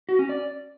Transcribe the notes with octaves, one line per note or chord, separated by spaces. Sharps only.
F#4
C#4
D5